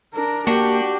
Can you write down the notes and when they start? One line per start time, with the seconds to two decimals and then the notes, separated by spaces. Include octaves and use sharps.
0.14 D4 A#4
0.47 A#3 D4 F#4 G4